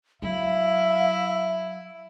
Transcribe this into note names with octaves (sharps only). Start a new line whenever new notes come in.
F#3 E4 E5 F5